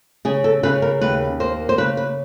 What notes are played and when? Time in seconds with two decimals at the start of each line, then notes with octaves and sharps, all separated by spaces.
0.25 C#3 G#4
0.44 A4
0.63 C#3 B4
0.82 A#4
1.01 D#2 B4
1.40 A#3 C5
1.69 C5
1.78 C#3 B4
1.97 B4